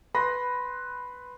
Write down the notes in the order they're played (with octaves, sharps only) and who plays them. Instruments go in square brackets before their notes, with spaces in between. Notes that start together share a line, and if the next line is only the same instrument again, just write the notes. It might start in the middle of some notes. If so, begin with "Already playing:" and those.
[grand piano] B4 B5 C6 A#6